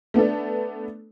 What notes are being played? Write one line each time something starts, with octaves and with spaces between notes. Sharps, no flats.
A3 B3 D4 A4